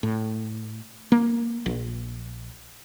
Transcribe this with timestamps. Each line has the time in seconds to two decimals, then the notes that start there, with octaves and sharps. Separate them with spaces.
0.03 A2
1.12 A#3
1.66 A#1